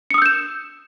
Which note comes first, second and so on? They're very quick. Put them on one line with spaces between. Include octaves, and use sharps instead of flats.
C#7 D#6 E6 G6 E7